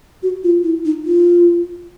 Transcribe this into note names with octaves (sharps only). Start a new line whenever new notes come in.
F#4
F4
E4
D#4
F4